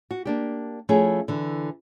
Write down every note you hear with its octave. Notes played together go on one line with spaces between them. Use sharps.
F#4
A#3 D4 G4
F3 A3 C#4 E4 G#4
D3 E3